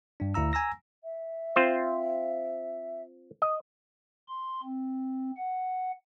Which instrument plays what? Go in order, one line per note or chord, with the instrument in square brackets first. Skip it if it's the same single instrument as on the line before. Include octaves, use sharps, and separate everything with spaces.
[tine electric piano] G2 D4
D2 E4 F5 A#5 E6
G#5 A#5 E6 A#6
[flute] E5
[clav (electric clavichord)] C4 F4 C5
D#5
[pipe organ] C6
C4
F#5